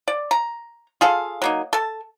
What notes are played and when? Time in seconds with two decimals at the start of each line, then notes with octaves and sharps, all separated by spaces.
0.08 D5
0.31 A#5
1.01 F4 G#4 A4 F5
1.42 F#3 A#3 D#4
1.73 A4 A5